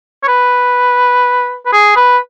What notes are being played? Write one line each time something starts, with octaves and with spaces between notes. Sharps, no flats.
C#5
B4
B4
G#4
B4